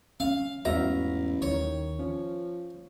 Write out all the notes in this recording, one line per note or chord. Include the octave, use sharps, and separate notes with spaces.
C#4 F5
A1 E2 G#2 B3 F#4 E5 F5 A#5
D#2 D#3 C#5
F3 C#4